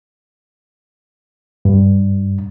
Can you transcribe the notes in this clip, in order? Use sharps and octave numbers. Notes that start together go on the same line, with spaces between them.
G2